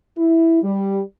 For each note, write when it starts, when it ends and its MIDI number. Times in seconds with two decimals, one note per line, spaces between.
0.18 0.61 64
0.62 1.01 55